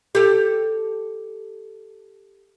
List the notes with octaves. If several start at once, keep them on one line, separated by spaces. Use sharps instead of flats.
G4 A4